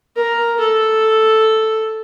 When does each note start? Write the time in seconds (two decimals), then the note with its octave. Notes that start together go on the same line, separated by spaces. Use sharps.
0.16 A#4
0.60 A4